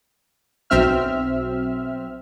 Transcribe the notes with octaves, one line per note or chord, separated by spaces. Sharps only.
B1 F#3 C4 E5 F6